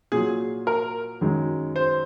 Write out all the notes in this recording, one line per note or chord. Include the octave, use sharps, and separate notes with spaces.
A#2 F#3 G#4
A#4
F#2 D#3 G#3
C5